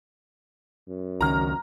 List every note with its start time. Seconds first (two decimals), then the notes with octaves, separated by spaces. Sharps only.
0.88 F#2
1.21 C#2 D#3 C#4 A#5 F6